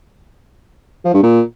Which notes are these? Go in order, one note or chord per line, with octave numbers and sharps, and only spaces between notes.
F3
G2
A#2